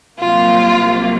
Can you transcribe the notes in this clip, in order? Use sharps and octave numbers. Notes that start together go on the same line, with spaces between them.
C2 C3 F#3 A#3 F4